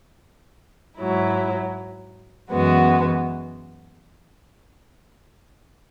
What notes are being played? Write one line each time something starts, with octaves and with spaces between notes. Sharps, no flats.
G#2 F#3 E4
F#2 E3 G#3 B3 F#4